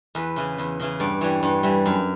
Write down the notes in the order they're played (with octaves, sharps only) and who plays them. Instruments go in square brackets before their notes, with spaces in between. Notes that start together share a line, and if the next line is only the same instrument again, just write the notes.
[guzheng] E2 B4
C#3 E3
E2
C#3 E3
G2 D5
E3 G3 C#5
G2
E3 G3
F#2